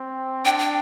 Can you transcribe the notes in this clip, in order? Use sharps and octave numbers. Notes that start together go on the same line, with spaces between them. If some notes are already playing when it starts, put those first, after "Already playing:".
Already playing: C4
D4 G5
G5